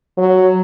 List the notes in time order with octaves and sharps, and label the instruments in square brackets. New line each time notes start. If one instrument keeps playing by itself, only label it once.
[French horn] F#3